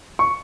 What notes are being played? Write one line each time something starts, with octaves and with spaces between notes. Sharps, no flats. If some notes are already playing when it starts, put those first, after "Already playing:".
C#6